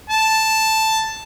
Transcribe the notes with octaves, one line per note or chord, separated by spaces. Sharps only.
A5